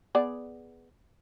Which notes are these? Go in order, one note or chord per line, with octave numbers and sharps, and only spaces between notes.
B3 G#4 D5